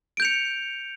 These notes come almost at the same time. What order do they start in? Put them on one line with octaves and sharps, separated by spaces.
D7 G6 F7 C#7